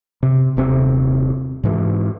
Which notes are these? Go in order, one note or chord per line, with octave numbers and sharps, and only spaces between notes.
C3
D#1 C3 C4
G#2 E3